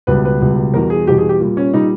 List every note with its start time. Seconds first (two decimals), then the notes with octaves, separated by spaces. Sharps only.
0.07 C#2 B2 G3 B4
0.25 B4
0.40 C#2 B2 G3
0.74 E2 B2 G3 A#4
0.90 G#4
1.07 E2 B2 G3 G4
1.18 G#4
1.29 G4
1.40 A#2 G3
1.57 C#4
1.74 A#2 G3 D#4